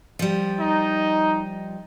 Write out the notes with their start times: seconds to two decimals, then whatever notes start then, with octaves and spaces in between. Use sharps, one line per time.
0.19 F3 G3
0.59 D#4